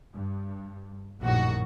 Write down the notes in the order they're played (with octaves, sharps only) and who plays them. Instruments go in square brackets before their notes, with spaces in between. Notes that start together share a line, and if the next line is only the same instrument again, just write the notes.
[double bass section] G2
[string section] A#1 F#4 [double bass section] F#2 A2 D#3